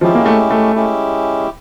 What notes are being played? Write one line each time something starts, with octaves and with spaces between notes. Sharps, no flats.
F3 G#3 C#4 E4 G4
A#3
A3
A3
G#3 C#4 E4 G4